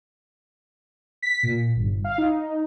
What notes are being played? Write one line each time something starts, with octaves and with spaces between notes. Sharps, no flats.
B6
A#2
G1
F5
D#4